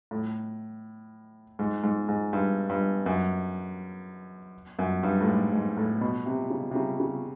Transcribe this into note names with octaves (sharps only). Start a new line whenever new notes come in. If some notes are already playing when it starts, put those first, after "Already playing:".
A2
G#2
G#2
G#2
G2
G2
F#2
F#2
G2
A2
G#2
G#2
A2
B2
C3
C#3
C3
C#3
C#3